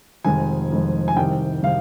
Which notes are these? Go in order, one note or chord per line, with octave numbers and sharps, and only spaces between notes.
F1 F2 D#3 G#3 G#5
F1 F2 D#3 G#3
G#5
C2 C3 D#3 G5
C3 D#3 F5